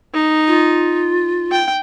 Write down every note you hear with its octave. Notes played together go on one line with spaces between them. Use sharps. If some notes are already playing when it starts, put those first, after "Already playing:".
D#4
F4
G5